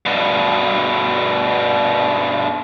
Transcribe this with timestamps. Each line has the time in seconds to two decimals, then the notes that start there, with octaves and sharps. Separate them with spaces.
0.06 G2 B2